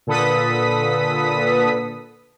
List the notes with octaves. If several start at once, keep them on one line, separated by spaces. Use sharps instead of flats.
A#2 D3 A4 B4 D#6 B6